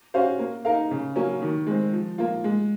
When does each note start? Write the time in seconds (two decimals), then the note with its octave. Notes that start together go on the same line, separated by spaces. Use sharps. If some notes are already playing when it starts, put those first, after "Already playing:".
0.14 C#4 F#4 C5 F5
0.39 A#3
0.65 D#4 A#4 F5
0.91 C#3
1.16 F#3 A#3 C#4
1.42 D#3
1.67 G#3 C4
1.93 F3
2.18 A#3 F4
2.44 G#3